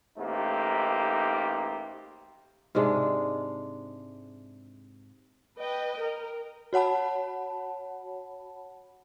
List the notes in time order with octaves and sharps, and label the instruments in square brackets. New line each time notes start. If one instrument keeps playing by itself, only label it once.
[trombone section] A1 A3 A#3 D#4 G4 C5
[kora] G#2 C3 G#3 D4
[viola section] B4 D#5 G5
A#4
[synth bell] F#4 C#5 F#5 A5 B5